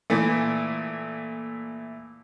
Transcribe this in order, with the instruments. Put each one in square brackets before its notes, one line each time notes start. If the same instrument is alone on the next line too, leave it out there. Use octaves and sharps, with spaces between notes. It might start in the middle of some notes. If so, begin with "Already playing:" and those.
[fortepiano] A#2 E3 A3